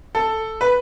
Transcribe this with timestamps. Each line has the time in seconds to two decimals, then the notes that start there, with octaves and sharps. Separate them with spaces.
0.15 A4
0.61 B4